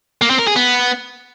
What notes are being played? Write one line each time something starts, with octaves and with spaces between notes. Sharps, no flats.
A#3
C4
A#4
G#4
B3